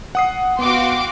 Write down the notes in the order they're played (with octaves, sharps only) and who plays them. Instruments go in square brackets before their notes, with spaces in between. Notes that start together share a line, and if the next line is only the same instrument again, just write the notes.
[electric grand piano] F#5 D#6 C7
[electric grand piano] B3 [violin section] F#4 F5 G5 [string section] C6 D6